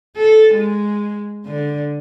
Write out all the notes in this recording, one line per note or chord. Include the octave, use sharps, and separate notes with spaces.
A4
G#3
D3